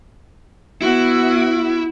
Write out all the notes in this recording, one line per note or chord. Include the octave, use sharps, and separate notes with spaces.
B3 E4 F#4